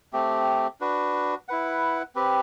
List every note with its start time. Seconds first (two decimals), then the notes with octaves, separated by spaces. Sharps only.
0.13 A3 C4 G4
0.81 D4 F#4 B4
1.49 E4 B4 F#5
2.15 C4 G4 B4